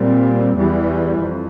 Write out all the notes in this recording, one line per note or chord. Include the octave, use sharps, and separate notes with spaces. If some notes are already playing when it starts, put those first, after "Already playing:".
Already playing: A#2 G3 C4
E2 E3 G3
F2